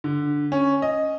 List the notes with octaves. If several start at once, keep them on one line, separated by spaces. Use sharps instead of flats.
D3
C#4
D#5